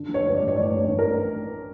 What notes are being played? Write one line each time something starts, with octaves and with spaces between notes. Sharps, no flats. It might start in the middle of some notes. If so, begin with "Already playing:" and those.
Already playing: D3
F3
C#5
G2
D5
A1
C#5
A1 D5
G2
C#5
A1
A#4